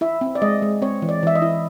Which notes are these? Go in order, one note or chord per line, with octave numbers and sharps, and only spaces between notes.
E4 E5
C4
D5
G#3 D#5
G#3
C4 C#5
E3
D5
E3 E5
D#5
E4